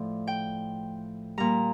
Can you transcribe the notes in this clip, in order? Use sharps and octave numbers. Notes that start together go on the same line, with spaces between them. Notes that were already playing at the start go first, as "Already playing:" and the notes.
Already playing: A2 F3 D5
G5
A#2 G3 A#5